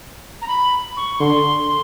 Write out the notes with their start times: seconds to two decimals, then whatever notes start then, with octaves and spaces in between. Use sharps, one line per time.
0.42 A#5
0.48 B5
0.97 C#6
1.20 D3 C6